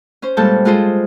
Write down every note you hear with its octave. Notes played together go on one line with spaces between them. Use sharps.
C#4 C5
A#2 G3 G#3 A4 A5 G6
G#3 F4 G#4 A4 C5